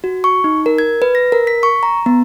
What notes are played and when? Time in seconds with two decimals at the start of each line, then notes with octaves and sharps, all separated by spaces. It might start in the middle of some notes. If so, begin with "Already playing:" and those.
0.04 F#4
0.24 C#6
0.44 D#4
0.66 A#4
0.78 G#6
1.02 B4
1.15 A#6
1.32 A#4
1.47 B6
1.63 C#6
1.83 A#5
2.06 B3